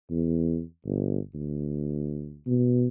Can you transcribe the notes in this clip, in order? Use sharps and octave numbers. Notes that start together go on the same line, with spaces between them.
E2
G1
D2
B2